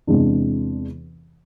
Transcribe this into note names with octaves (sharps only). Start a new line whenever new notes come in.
E2 C3 E3 G#3 D4